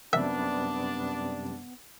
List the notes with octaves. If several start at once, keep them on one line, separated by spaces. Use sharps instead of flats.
F#2 C3 G3 B3 D4 E5